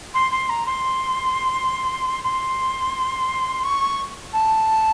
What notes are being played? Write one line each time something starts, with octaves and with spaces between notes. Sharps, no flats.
C6
C6
A#5
C6
C6
C#6
A5